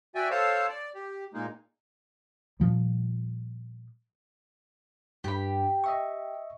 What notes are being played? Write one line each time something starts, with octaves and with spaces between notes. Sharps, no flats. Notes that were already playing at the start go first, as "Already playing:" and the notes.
F#4 D5 E5 G5 G#5
A4 C5 C#5 F5 A5
D5
G4
A#2 G#3 A#3 D#4
A#2 F3 G3
G2 G4 B5
D#5 E5 C#6